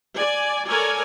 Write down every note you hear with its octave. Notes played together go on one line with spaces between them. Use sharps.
D5 G#5
A4 A#4 C#5 D5 G#5